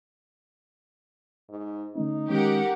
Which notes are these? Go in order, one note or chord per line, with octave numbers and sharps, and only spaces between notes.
G#2
D3 A3 C#4 D#4
D#3 G#3 C#4 G4 A#4 F#5